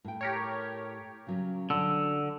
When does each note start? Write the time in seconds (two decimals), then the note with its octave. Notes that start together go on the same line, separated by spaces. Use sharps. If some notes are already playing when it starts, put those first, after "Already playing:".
0.05 A2 G5
0.21 G4 A#4 C#5
1.27 C#3 F#3 C#4
1.70 D3 F#3 C#4 D4 E6